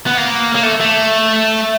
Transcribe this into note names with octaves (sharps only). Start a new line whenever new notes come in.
B3
A#3
A#3
A3
A3